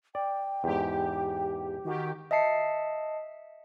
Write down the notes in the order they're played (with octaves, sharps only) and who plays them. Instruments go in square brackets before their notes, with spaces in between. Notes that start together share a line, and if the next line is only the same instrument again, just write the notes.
[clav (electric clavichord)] D5 [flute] G5
[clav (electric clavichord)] E2 G#2 [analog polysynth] G4
[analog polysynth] D#3 G4 [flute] F#4
[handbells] D#5 E5 A5 C7 C#7